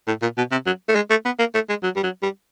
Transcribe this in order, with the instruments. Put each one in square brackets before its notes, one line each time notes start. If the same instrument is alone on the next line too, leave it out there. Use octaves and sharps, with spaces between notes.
[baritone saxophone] A2
A#2
B2
C3
F#3
A3
G#3
A3
B3
A#3
A3
G#3
F#3
G3
F#3
G3